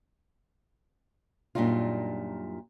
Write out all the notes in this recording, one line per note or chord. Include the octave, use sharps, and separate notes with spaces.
F#2 A#2 G3 D4 D#4 F4